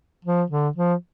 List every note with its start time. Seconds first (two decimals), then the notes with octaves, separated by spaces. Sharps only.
0.25 F3
0.50 D3
0.76 F3